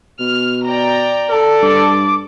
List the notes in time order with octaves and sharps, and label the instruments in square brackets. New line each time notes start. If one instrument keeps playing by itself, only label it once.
[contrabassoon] B2 [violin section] F6
[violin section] D5 G5 A#5
[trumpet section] A4 [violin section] D5
[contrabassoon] G2 [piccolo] D6